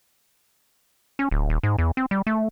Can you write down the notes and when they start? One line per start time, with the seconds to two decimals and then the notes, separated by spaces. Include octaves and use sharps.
1.19 C#4
1.31 D1
1.50 D#1
1.63 G#2
1.78 E2
1.97 C4
2.11 G3
2.27 A3